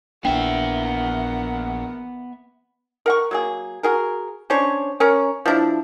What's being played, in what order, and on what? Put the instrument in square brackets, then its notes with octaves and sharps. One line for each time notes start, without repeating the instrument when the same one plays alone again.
[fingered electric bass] A#1 D4 [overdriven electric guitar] B3 E5 [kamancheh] A#4 F#5 [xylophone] G5
[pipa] A#4 F#5 C#6
F#3 A#3 G#4
F#4 G#4 A#4
C#4 D4 C5 C#5
C#4 A#4 C#5 A#5
F3 D4 E4